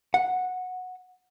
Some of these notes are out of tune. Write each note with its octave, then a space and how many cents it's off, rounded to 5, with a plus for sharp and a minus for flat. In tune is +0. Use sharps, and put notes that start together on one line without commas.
F#5 -10